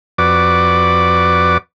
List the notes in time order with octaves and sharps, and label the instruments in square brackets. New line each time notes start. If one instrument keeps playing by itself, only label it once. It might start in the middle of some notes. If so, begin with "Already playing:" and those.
[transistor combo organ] F2 F#4 B4 D5 D6